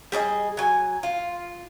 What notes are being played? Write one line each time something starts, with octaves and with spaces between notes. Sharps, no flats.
G3 G#4 D5 D#5
F#3 G#5
F4